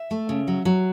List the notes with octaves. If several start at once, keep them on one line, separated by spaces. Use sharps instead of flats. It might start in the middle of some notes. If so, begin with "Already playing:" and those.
Already playing: E5
A3
C#3
F#3
F#3